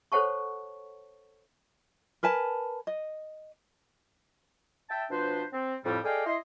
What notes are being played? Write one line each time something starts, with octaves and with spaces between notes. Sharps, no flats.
A4 C5 C#5 F#5 A5 C#6
A#4 B4 G#5 A5
D#5
E5 G5 A5
B2 F3 D4 B4 C5
C4
F2 A2 G3
G#4 A4 D5 D#5 F5 G5
E4 D#5 C6